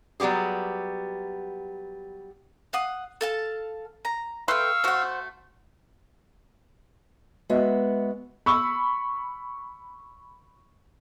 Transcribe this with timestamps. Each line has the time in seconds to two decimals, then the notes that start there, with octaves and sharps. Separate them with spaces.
0.20 F#3 G3 B3 G4 G#4
2.73 F5 F#5 D#6
3.21 A4 F5 A5
4.05 A#5
4.48 A3 B4 E5 F5 G5 C6 C#6 E6
4.84 A3 F#4 C5 F#5
7.50 G#3 B3 F#4 E5
8.46 B5 C#6 E6